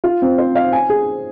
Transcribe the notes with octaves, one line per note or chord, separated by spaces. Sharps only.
F4
C4
C5
F5
G#5
G#4